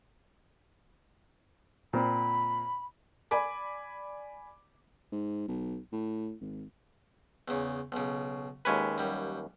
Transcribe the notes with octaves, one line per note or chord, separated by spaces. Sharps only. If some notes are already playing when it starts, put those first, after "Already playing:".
A#2 C4 B5
D5 G#5 B5 D6
G#2
B1
A2
G#1
E2 C#3
B1 C#3
D#2 G#3 C#4 E4 B4 G#5
F#2 G3